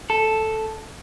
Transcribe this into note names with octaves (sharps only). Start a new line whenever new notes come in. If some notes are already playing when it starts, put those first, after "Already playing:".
A4